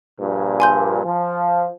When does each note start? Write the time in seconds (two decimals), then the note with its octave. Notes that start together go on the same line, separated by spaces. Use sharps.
0.18 A#1 G2 A#2
0.60 G#5 C6 G6
1.04 F3